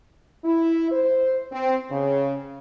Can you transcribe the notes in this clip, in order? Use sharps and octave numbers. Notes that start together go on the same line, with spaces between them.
E4
C5
C4
C#3